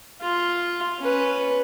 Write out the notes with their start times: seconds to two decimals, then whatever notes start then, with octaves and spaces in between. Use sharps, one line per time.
0.21 F4
1.00 C#4 B4